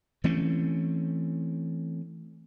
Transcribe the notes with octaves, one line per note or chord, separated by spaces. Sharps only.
E3 A3 C4 C#4